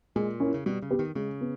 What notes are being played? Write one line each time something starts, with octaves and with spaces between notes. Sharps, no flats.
A#2 G#3
C#4 E4 A#4 C#5
C#3
B2 G3
C#3
B3 G4 B4
D#3
C#3 G#3
B3